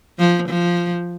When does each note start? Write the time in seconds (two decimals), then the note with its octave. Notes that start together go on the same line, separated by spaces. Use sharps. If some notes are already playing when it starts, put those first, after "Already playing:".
0.19 F3
0.49 F3